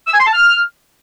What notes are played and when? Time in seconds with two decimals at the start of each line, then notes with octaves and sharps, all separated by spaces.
0.07 E6
0.14 G#5
0.20 C6
0.26 A5
0.33 F6